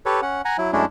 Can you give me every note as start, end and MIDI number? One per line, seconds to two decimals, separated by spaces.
0.06 0.21 67
0.06 0.21 69
0.06 0.21 71
0.06 0.21 73
0.22 0.42 61
0.22 0.42 78
0.45 0.57 78
0.45 0.57 80
0.45 0.57 82
0.58 0.72 54
0.58 0.72 64
0.73 0.85 42
0.73 0.85 56
0.73 0.85 57
0.73 0.85 61
0.73 0.85 62
0.73 0.85 64